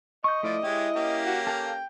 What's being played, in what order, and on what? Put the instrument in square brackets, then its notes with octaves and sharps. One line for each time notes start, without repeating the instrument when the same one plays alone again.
[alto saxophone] D#5 [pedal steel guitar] C#6 G6
[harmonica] F3 [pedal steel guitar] A3 E4 D5
[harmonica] G#3 G4 C#5 [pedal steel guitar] E4
[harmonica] A#3 C#4 G4
[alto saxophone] F#4
[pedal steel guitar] A4 F5 F6 [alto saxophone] G5